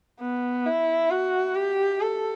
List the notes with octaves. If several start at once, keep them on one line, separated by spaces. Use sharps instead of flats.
B3
E4
F#4
G4
A4